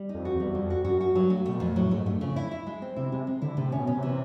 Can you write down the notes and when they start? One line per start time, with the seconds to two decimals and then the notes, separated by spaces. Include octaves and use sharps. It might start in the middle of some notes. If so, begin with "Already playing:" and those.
Already playing: G3
0.09 D#4
0.14 F2
0.25 F#4
0.35 E2 G3
0.50 E2
0.54 F2 G3
0.70 F#4
0.84 F#2 F#4
1.01 F#4
1.15 G2 F#3
1.30 A3
1.46 B2 A3
1.56 F2 A#2
1.76 A2 F#3
1.91 G#2 A3
2.06 G2 A3
2.21 F2 C#3
2.36 E4
2.51 E4
2.67 G#3
2.82 C4
2.96 C3 E4
3.12 C3 G#3
3.27 G#3
3.42 D3 E4
3.57 A2 C3
3.72 C#4
3.78 B2
3.87 C#4
3.97 C3
4.03 E3